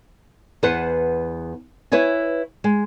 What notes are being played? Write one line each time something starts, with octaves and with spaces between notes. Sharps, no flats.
E2 B3 B4 C5 F#5
E4 B4 C#5 E5 G#5
G#3